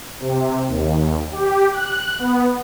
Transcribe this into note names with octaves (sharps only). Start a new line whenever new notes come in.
C3
D#2
G4
F#6
B3